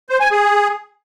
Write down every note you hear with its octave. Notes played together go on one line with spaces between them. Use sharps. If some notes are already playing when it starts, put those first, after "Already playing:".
C5
G#5
G#4